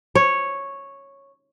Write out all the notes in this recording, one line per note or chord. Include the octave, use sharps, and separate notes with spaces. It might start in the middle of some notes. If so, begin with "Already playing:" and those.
C#5